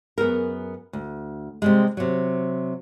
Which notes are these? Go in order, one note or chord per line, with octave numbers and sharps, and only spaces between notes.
F#2 B3 G#4 A#4
D2
C3 G3 G#3
C3 F#3